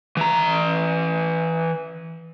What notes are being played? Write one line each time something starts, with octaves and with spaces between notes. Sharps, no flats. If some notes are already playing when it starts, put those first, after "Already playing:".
E3 A#5